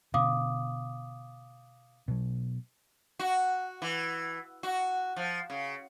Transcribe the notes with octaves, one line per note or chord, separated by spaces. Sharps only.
B2 D3 F5 D6 D#6
B2 F#3
F#4
E3
F#4
F3
C#3